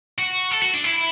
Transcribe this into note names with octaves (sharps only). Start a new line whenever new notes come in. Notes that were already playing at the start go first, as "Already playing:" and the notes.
F#4
A4
F#4
D4
E4